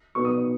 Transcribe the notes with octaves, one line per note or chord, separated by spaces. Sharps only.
B2 B3 D#4 C#6
D#6